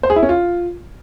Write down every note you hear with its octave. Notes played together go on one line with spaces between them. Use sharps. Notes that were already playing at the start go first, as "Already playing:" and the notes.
C5
G#4
E4
C#4
F4